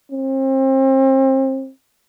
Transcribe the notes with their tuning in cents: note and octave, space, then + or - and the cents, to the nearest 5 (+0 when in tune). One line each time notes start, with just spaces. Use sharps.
C4 +35